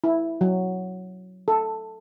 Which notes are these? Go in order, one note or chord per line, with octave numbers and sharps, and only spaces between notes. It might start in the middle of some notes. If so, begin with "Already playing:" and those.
E4
F#3
A4